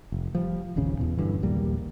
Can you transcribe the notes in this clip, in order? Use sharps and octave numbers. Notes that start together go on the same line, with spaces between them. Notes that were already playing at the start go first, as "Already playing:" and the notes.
F1
F3 G3
D#1 G#1 C#3 C#4
E2 B2
G2 D3 E3
A#1 D#2 G3 A#3